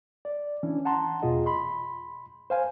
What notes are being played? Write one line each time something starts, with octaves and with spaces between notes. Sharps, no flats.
D5
E3 C#4 D4
F#5 A5 A#5 C6
E2 B2 F4 G#4 D#5
B5 C6
C5 F5 G#5